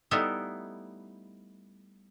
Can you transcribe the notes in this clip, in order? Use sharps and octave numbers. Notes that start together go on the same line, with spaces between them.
G3 A3 B3 D#4 E4